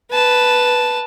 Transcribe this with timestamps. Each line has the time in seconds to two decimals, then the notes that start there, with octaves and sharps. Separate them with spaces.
0.12 B4 A5